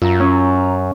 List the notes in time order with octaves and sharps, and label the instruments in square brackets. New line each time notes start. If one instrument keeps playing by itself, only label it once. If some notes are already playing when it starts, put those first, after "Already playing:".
[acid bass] F#2 [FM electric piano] F4 A#5 [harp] E6
[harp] C#4